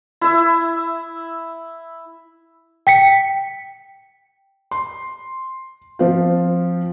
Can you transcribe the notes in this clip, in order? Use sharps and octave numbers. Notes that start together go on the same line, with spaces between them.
E4 E5
G5 B6 C#7
C6
F3 C4 F4